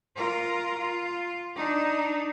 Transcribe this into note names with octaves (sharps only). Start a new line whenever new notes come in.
F4 A#4
F4
D4 D#4